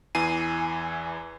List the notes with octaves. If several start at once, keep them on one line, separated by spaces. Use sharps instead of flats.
E2 E3 G#5 C7 D#7